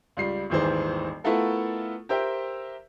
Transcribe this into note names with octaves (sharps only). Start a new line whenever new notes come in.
C#2 G3 C7
D#1 G#1 D#3 E3 G#4 C5
A3 B3 E4 F4 A4 A#4
G4 A#4 C5 E5 G5